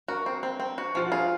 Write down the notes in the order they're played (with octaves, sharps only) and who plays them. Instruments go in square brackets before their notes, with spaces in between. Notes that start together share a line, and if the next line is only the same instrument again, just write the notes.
[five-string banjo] F#4 [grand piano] A#4
[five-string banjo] C4
C4
C4
F#4
[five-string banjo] F3 [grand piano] F4
[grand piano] F#4
[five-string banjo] F4 [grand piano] G#4